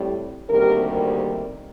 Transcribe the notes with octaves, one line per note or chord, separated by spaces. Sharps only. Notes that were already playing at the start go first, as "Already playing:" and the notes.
Already playing: A2 G3 C4
D2 C3 D#3 G3 A#3 A#4